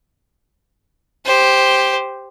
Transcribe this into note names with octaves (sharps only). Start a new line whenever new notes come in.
G4 C5